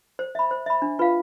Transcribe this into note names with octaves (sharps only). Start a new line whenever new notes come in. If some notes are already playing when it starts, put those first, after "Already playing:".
C5
E5 B5
C5
E5 B5
D4
F4 B4 F5